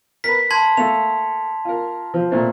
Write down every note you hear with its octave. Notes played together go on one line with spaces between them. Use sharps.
A#4 B4 B6
A5 C6 G#6
A3 A#3 A4 F7
F4 A#4
F3
A#2 A3 C4